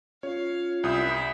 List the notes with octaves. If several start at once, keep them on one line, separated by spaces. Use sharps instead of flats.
C#4 F4 C#5 F5
C2 E4 E5 D#6 G6